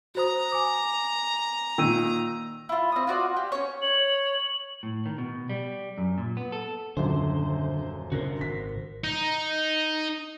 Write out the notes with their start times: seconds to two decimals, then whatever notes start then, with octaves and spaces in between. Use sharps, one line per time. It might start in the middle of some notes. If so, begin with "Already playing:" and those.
0.15 F#4 C5 A#5 D#6
0.52 G#5 D6
1.78 A#2 D#3 E6 D#7
2.69 E4 F4
2.92 C4 D#6
3.07 F4 F#4 D5
3.37 G4
3.52 C#4 C#5
3.82 C#5 F#7
4.83 A2
5.06 D#3
5.18 B2
5.49 G3
5.98 F#2
6.18 A#2
6.37 B3
6.52 A4
6.97 D#1 F#2 D3 C5
8.12 C#3 D4 F#4 A#4 C5
8.41 G#1 B6
9.04 D#4